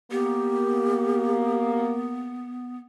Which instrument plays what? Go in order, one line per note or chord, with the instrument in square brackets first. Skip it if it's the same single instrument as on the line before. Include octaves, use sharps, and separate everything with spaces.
[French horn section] A#3 [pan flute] B3 [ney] G4